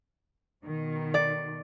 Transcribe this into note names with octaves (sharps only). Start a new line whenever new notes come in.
B2 D#3
D5